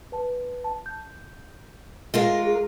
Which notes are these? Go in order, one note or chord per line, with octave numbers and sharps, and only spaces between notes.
B4 A5
A5
G6
G#3 F4 A#4
G#4